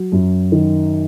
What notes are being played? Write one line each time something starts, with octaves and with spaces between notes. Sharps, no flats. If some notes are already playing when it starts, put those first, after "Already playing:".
Already playing: F#3
F#2
D#3